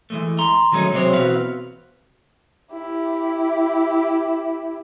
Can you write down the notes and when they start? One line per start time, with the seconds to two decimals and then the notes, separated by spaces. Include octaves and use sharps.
0.10 E3 G#3 A3
0.39 A#5 C6
0.72 D#3 F#3 G#3 A3 C#4 D#4
0.93 C3 F#3 G#3 C4 C5 C#5
1.13 E2 B2 C4 F#4 B4 F5
2.72 E4 G4